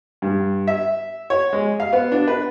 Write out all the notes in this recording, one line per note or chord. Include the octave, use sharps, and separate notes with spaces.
G2
E5
C#5
G#3
F5
B3
D4
B4